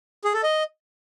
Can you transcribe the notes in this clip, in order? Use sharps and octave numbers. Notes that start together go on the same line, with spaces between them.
G#4
A4
D#5